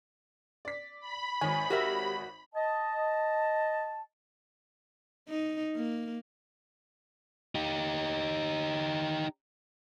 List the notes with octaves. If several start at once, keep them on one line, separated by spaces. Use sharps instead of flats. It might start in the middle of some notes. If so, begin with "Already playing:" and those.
D5 B6
B5
G#1 D#3 C#5 G#5
F#4 G4 A#4 E5
D#5 A5
D#4
A#3
D#4 G4